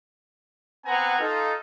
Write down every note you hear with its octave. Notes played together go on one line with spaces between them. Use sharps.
B3 C4 B4 F#5 G#5 A#5
D#4 F4 A4